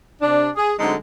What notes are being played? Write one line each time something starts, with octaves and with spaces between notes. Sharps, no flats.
C3 D4
G#4
D3 F#3 G#3 A3 C4 D#4